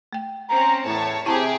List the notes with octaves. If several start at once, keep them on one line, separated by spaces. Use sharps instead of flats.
A3 G5
C4 C#4 A#5
E2 A2 C#5 A5
C3 E4 G4 G#4 A5 A#5